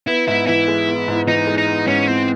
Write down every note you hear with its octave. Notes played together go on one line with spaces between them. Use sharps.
B3 E4
G#2 E4
E3 E4
G#3
B3
G#2
E3 D#4
G#3
D#4
B3
G#2 C#4
E3 C4